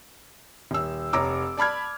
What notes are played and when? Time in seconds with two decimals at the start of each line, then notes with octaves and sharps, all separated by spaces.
0.71 D#1 E6
1.13 F1 C#5 A#5 D6 E6
1.57 D5 A5 B5 F6 G#6